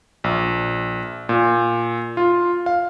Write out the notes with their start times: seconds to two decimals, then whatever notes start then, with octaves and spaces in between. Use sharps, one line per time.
0.24 A#1
1.29 A#2
2.17 F4
2.66 F5